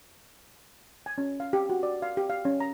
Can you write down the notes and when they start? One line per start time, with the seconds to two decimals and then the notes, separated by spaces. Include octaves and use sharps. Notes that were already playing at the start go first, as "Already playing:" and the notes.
1.06 G#5
1.18 C#4
1.40 F5
1.53 G4
1.70 F#4
1.83 D5
2.02 F5
2.17 G4
2.30 F5
2.45 C#4
2.60 A#5